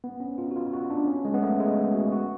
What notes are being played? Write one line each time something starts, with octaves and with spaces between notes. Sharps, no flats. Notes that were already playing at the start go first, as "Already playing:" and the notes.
B3
C#4
F4
F#4
F4
F#4
D4
C#4
G#3
B3
A3
G#3
F#4
F#4